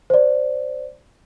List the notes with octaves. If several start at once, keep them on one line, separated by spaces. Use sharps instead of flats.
C5 D5